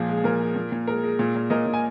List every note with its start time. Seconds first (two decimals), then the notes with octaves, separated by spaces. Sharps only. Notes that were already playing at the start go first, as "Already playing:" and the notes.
Already playing: A#2 F3 G#4
0.09 G#3
0.17 G#4
0.24 A#2 A#4
0.41 G#3
0.56 A#2
0.72 A#2
0.87 G#3 A#4
1.03 G#3
1.19 A#2
1.35 A#2
1.50 A#2 A#4 D#5
1.66 A#2
1.74 G#5